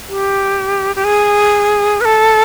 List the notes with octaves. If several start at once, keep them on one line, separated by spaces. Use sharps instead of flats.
G4
G4
G#4
B4
A4